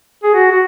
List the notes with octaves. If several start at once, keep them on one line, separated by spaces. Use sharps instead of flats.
G#4
F#4
F#4